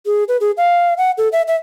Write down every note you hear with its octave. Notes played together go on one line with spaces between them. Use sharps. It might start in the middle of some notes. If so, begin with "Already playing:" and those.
G#4
B4
G#4
F5
F#5
A4
E5
E5